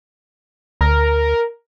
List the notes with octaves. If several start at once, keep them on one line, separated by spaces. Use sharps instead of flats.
D2 A#4